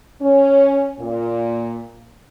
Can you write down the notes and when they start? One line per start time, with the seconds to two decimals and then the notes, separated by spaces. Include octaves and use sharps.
0.21 C#4
1.00 A#2